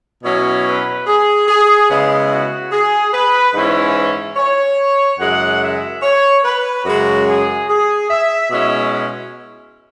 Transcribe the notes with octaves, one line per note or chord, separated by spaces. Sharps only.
B2 F#3 C#4 E4 C#5
B4
G#4
G#4
C#3 G#3 B3 E4 G#4
F#4
G#4
B4
G#2 E3 C#4 E4
C#5
F#2 C#3 G#3 E4 F#5
E5
C#5
B4
F#2 C#3 G#3 F#4
G#4
G#4
E5
B2 G#3 C#4 E4 E5